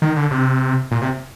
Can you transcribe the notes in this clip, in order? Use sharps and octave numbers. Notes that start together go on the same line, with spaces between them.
D#3
D3
C3
A#2
C3